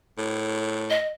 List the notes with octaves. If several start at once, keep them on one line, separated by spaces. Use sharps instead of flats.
A2
D#5